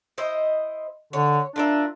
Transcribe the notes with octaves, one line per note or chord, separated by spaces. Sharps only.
E4 C5 D#5
D3 C#5
D4 F4 A#4 E5